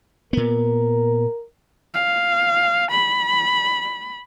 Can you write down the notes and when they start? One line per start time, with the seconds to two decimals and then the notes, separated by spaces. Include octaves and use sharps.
0.33 A#2 B3 A#4
1.94 F5
2.91 B5